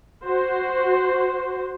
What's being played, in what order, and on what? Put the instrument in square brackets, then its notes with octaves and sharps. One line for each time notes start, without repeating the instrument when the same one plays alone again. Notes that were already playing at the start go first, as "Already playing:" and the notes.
[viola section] F#4 C5